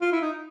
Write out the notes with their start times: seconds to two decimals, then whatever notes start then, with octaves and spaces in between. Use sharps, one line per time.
0.01 F4
0.12 E4
0.22 D#4